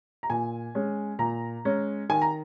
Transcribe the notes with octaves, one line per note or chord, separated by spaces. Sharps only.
A#5
A#2 G#5
G#3 C#4
A#2 A#5
G#3 C#4
D#3 G#5
A#5